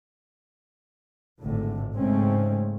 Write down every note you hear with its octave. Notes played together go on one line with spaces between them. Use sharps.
G#1 A2 D3 A3
G#2 C#3 G#3 A3 C4 C#4